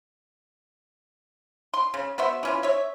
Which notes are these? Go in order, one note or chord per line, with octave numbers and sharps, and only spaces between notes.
C6
C#3
B3 F#4 C5 E5
E3 C#4 F4
C#5 E5